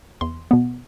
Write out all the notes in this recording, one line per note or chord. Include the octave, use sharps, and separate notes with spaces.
E2 C6
B2 B3